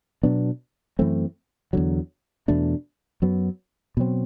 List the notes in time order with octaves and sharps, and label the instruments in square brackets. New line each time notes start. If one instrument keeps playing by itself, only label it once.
[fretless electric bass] B2 F#3 B3 D4
F#2 E3 A3 C4
E2 D3 F#3
E2 B2 A3 D4
F#2 F#3 B3
B2 F#3 C4